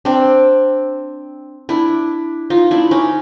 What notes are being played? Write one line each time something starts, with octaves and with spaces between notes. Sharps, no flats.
C4 D4
D4 E4
D#4 F4
D4 E4
C#4 D#4